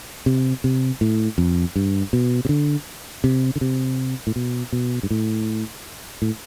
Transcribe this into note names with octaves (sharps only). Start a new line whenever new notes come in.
C3
C3
A2
F2
G2
B2
C3
D3
C3
D3
C3
A2
B2
B2
G2
A2
A2